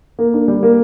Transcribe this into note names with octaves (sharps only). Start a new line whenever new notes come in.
A#3
D4
G3
A#3